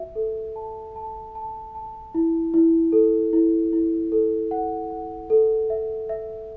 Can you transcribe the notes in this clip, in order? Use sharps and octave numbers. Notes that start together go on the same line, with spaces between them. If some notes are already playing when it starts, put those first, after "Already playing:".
Already playing: F#4 E5
A4
A5
A5
A5
A5
E4
E4
A4
E4
E4
A4
F#5
F#5
A4
E5
E5